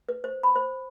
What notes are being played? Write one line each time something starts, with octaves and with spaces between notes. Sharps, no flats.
B4
C5
B5
C5